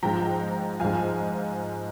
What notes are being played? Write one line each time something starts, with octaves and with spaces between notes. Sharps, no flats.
G#2 F3 G5 A#5
G#2 F3 F5 G#5